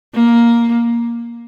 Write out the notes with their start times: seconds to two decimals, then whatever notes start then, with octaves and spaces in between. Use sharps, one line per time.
0.15 A#3